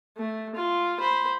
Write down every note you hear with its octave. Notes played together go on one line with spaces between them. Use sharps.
A3
F4
C5 B5